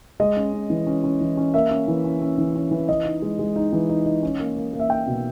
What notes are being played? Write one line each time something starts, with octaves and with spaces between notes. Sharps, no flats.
G#3 D#5
C#4
C#4
E3
C#4
C#4
E3
C#4
A#3 E5
C#4
E3
C#4
C#4
E3
C#4
E3
E3 D#5
D#4
G#3
G#3
D#4
E3
D#4
D#4
C#4
A#3
A#3
A#3
E5
A#3 G5
B2